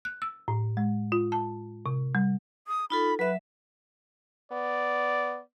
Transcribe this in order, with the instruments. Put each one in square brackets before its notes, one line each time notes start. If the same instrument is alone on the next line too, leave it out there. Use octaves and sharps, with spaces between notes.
[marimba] F#6
E6
A2
G#3
F4
A5
C3
G3
[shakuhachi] D#6
[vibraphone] D#4 F4 A4 [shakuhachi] B5
[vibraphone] F#3 E5 [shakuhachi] B4
[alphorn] B3 [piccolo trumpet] D5